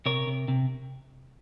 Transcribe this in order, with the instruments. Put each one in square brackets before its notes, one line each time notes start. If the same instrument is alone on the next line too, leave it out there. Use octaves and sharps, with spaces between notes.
[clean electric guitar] C3 A#4 C#5
C3
C3